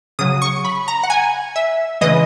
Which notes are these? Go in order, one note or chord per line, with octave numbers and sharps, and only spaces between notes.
C#3 F#3 D#6
C#6
B5
A#5
F#5
G#5
E5
C#3 E3 G#3 D#5